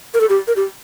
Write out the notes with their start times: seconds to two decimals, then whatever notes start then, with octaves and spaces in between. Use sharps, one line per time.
0.14 A#4
0.21 A4
0.29 G4
0.47 A#4
0.56 G4